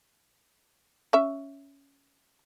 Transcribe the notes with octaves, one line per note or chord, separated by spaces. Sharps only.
C#4 E5